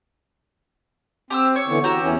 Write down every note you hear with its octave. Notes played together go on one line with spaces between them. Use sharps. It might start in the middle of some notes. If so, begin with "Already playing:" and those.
C4 G4 D#6 E6
C#5
D3 E3 B3
F#4 G4 A#5 E6
E2 E3 C#4